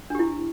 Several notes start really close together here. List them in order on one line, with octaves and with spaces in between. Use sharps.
D4 G4 E4